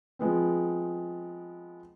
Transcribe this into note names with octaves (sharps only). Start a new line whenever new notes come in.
F3 G#3 B3 C4